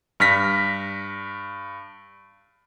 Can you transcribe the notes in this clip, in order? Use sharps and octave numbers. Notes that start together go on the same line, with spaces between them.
G2 F6 A#6 B6